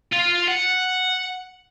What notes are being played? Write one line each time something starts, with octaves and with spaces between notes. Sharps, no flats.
F4
F#5